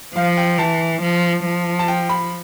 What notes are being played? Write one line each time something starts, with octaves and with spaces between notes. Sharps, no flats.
F3 F5
G5
E3 A5
F3
F3
A5
G5
B5